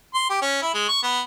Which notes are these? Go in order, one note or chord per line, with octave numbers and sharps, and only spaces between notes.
C6
G4
C#4
E4
G#3
C#6
B3